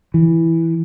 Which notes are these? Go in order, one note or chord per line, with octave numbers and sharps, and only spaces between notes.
E3